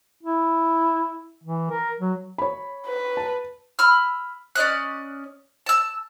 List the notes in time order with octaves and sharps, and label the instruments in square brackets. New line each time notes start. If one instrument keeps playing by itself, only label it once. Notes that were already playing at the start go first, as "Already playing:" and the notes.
[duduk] E4
E3
A#4
F#3
[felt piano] C#5 B5
[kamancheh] B4
[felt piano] A5
[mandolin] B5 E6 F6
C#4 D5 D#5 F#6
A5 E6